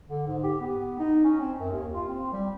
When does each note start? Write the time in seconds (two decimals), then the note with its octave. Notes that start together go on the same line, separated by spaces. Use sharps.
0.10 D3
0.27 G#2
0.43 G4
0.61 B3
0.99 D#4
1.24 C#4
1.41 C4
1.59 F#2
1.72 D#2
1.94 F4
2.09 C4
2.33 G3